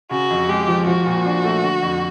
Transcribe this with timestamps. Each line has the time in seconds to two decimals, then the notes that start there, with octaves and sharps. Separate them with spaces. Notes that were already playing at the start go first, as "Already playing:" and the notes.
0.11 C#3 F#4
0.30 F2
0.49 G#3 G4
0.68 F3
0.87 F3 F#4
1.06 A#2
1.26 D4
1.44 A3
1.63 D3
1.82 F2